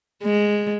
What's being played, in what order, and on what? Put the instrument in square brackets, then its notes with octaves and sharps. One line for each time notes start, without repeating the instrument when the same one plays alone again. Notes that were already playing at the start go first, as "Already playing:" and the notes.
[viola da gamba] G#3